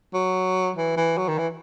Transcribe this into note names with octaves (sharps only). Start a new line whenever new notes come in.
F#3
E3
E3
F#3
D#3
E3